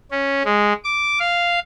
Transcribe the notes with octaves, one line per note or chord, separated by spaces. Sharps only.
C#4
G#3
D6
F5